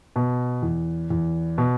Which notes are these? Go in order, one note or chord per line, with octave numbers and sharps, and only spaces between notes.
B2
E2
E2
B2